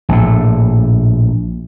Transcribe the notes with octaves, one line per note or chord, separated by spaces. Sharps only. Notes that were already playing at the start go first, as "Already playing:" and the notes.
A#1 A2